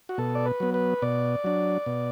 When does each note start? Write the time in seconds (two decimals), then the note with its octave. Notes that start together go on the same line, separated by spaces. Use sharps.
0.09 F#4
0.18 B2 A4
0.35 D5
0.46 B4
0.60 F#3 B3
0.74 B4
1.02 B2 D5
1.44 F#3 D4
1.86 B2